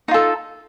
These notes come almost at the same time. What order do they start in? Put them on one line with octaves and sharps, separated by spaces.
D#4 F4 A4